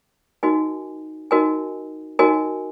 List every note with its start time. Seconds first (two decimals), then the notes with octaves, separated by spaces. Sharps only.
0.43 D#4 F#4 A#4 D#5 G#5
1.31 D#4 F#4 A#4 D#5 G#5
2.19 D#4 F#4 A#4 D#5 G#5